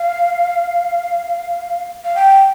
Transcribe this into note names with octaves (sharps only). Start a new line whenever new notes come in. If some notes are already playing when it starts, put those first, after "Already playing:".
Already playing: F5
F5
G5